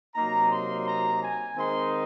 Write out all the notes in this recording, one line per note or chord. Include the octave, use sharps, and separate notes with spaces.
C3 F#3 A#3 D#4 A#5
C6
A#5
G#5
D#3 G#3 C4 D#4 C6